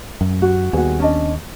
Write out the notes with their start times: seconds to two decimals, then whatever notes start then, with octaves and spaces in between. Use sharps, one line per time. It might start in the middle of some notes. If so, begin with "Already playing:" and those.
0.21 F#2
0.42 F#4
0.73 D#2 G3 B3 F#4 G#4
1.00 C#4 D4 D#5